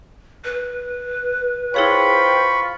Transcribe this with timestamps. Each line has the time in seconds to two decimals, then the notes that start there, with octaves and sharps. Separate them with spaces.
0.44 B4
1.74 E4 F4 G#4 C5 C#5 G5 B5 C#6